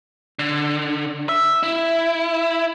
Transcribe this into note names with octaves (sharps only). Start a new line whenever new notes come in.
D3
E5
E4